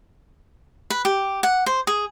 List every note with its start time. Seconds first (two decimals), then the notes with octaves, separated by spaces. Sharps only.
0.90 B4
1.05 G4
1.43 F#5
1.66 C5
1.87 G#4